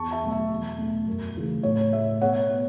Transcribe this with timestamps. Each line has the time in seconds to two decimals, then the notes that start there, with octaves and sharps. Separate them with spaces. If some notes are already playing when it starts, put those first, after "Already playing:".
Already playing: E2 A5 C#6
0.11 E5 A5
0.21 B2 F#3 A3
0.31 E5
0.50 E2
0.79 B2 A3
1.07 F#2
1.36 C#3 E3 A3
1.63 A2 C#5
1.92 A3 E5
2.21 B2 C#5 F#5
2.49 B3